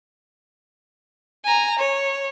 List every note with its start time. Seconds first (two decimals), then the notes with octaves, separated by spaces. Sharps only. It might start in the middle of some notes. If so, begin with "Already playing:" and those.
1.45 G#5 A#5
1.79 C#5